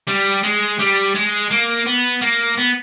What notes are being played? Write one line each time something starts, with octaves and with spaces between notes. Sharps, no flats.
G3
G#3
G3
G#3
A#3
B3
A#3
B3